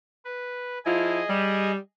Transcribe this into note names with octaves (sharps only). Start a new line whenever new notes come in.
B4
F3 E4 F4 G#4 D#5 G#5
G3